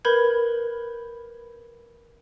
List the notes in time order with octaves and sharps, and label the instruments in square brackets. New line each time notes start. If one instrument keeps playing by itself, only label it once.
[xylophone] A#4 B4 B5 G6 G#6